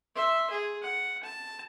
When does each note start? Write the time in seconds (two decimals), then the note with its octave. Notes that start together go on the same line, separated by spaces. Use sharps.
0.15 E5 C6
0.50 G#4
0.82 F#5
1.23 A5